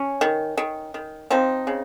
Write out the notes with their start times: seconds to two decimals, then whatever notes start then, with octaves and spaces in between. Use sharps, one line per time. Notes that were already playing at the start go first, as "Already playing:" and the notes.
Already playing: C#4
0.21 D#3
0.57 D#3
0.94 D#3
1.30 F3 C4 D#4
1.67 C#3